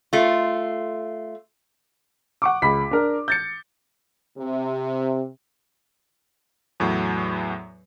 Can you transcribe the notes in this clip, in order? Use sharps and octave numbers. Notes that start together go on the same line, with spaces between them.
A3 F4
F#5 C#6 D6
C#2 B5 B6
D4 A#4
G6 A6 C#7
C3
E2 A2 F#3